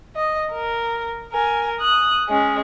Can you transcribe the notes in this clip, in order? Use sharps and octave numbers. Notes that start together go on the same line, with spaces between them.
D#5
A#4
A#4 G#5
D#6 F#6
G#3 C#4